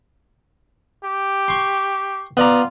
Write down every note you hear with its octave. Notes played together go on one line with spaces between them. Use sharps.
G4
C6 C#6
B3 F4 D5 A#5